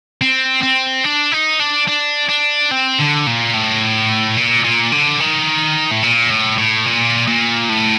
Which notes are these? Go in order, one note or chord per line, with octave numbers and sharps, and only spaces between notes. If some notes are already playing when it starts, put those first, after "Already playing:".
C4
C4
D4
D#4
D4
D4
D4
C4
D3
A#2
A2
A#2
A#2
D3
D#3
A2
A#2
A2
A2
A#2
A#2
A2